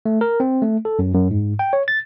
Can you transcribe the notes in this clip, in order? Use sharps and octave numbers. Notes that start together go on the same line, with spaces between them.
A3
A#4
C4
A3
A4
F#2
F#2
G#2
G5
C#5
A6